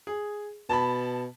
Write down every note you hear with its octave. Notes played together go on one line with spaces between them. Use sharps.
G#4
B2 A5 B5